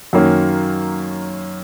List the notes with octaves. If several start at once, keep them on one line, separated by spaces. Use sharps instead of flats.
F#2 D#3 A#3 C#4